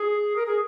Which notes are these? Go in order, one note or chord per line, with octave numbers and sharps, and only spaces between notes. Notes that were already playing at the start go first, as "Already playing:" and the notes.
Already playing: G#4
A#4
G#4